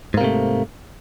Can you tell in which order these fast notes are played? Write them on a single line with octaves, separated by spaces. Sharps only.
G#2 A#3 C3 A3